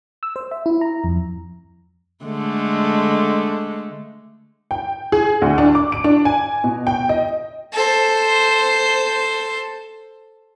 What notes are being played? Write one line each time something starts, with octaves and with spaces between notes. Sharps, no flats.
E6
C5
E5
E4
A#5
F2
D3 G#3 A3
G5
G#4
D2
D4
D6
D7
D4
G#5
B2
G5
D#5
A4 C5